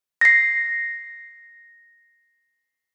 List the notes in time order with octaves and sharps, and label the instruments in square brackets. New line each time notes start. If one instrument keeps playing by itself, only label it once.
[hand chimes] A#6 C7